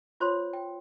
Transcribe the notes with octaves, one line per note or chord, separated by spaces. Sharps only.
F4 C5 C#5 C6
G5